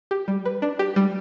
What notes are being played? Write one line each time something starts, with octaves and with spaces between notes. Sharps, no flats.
G4
G3
B4
D4
G4
G3